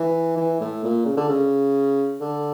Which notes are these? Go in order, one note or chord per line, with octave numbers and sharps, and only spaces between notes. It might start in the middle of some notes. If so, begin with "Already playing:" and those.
Already playing: E3
E3
A2
A#2
C#3
D3
C#3
D3